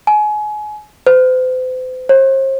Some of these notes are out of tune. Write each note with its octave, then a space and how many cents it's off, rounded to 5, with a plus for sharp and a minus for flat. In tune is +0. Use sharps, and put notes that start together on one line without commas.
G#5 +30
C5 -40
C5 +40